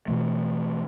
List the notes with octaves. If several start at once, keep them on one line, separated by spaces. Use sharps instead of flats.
B2 E3 A3